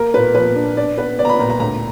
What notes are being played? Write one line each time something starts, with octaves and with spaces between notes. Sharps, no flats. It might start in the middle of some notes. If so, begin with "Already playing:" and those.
Already playing: A#3 A#4
A#2 B4
F3 B4
D4
D4 D5
B3 B4
B3 D5
A#5
B5
A#2 A#5
A#5
D2 A#5